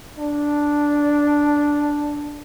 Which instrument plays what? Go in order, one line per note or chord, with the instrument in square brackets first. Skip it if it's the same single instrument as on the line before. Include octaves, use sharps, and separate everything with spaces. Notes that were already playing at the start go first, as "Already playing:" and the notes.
[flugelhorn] D4